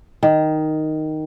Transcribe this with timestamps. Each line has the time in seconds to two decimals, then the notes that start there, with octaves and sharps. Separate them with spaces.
0.23 D#3